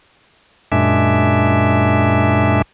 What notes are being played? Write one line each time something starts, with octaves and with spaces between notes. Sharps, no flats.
F#2 A#2 G#3 D4 E5